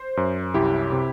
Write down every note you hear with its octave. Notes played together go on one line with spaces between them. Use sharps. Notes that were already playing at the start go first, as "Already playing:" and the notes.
Already playing: C5
F#2
C2 E4 G4
C3